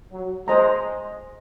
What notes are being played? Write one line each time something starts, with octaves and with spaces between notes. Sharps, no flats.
F#3
G#3 C5 D#5 A#5